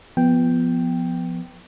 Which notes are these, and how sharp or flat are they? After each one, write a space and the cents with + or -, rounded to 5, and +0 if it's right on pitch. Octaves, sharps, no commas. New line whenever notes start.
F3 +0 B3 +0 G5 +0